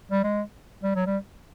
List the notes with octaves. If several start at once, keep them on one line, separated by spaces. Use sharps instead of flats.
G3
G#3
G3
F#3
G3